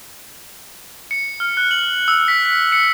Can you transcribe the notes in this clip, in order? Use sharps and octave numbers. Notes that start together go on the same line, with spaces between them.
C#7
F6
F#6
F#7
E6
B6
B6
C#7